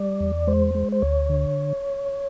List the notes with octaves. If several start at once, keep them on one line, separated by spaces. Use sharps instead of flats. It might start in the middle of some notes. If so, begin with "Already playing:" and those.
Already playing: G3 D5
E2
G#3 C5
G#3
C5
D2 C#5
D3